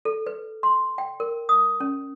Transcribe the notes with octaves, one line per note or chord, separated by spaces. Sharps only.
A4
B4
C6
G5
A#4
D#6
C#4